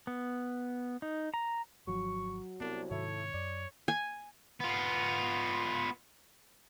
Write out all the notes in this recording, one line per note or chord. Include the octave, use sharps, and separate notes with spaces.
B3
D#4
A#5
G#1 F3 F#3 C#6
C2 B3 D4
G#2 C3 D#3 E4 A4 C#5
F#2 D5
G#5
B3 F4